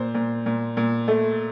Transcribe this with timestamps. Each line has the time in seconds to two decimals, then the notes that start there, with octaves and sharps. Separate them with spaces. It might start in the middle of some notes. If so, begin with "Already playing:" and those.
Already playing: A#2 C5
0.15 A#2
0.46 A#2
0.77 A#2
1.08 A3